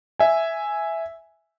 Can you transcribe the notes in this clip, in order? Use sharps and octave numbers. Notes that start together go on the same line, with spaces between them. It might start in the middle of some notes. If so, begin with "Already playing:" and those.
E5 G#5